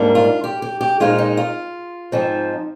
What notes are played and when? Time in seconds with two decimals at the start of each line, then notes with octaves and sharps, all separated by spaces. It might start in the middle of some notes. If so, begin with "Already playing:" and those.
Already playing: G#2 G3 A#3 D4
0.15 F4
0.44 G4
0.62 G4
0.81 G4
1.00 A#2 G#3 C4 D#4 F4
1.18 D#4
1.37 F4
2.12 G#2 F3 C4 D#4